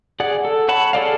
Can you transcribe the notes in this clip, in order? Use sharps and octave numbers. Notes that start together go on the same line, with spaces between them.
G#4 D5 F#5
A4
C#5 F#5 A5 B5
G#4 A4 D5 F5